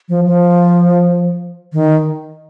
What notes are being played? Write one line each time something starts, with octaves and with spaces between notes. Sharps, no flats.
F3
F3
D#3